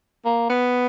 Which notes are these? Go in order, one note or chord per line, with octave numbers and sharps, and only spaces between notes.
A#3
B3